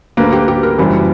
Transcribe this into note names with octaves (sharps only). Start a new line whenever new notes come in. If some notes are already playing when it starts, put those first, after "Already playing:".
D2 D3 A#3 B4
G4
G4
A#4
F#1 F#2 E3 G3